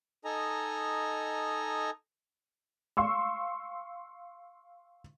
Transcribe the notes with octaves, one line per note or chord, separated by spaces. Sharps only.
D#4 A4 D#5 G#5 A#5
F5 C6 C#6 E6